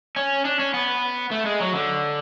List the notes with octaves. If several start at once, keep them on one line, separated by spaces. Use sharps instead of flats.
C#4
D4
C#4
B3
A3
G#3
F#3
D3